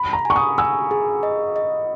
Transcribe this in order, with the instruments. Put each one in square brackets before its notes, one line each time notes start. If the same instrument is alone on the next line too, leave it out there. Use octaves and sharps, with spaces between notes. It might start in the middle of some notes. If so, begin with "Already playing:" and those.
Already playing: [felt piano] B5
A#5
[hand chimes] G#5 [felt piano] C#6
[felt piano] D#6
[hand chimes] G#5 [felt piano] E6
[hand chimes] G#4
D#5
D#5